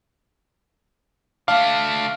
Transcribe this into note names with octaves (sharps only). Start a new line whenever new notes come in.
A3 D4 F5